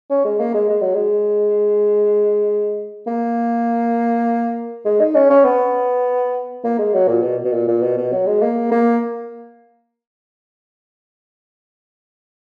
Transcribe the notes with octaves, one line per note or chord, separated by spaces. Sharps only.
C#4
G#3
A#3
G#3
G#3
F#3
G#3
A#3
G#3
D#4
C#4
C#4
B3
A#3
G#3
F#3
A#2
B2
B2
A#2
A#2
B2
B2
F#3
G#3
A#3
A#3